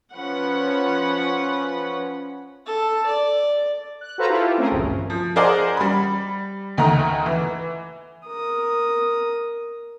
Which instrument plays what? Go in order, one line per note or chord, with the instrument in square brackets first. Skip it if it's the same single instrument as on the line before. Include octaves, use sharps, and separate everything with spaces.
[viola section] F3 C#4 B4 F#5
[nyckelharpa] A4
D5
[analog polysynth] F#6
F#4 A4 B4 C5 F5 A#5
E4 F4 G4 A4
A3 C4 C#4 G#4 A#4
A1 D2 G2 A#2
[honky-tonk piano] F3
G#4 A#4 C5 D5 D#5 F#5
G3 B5
D2 D#3 A3 F#5 A#5
E3
[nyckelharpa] A#4 D#6